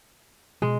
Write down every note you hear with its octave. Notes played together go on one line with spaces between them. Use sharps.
B2 G#3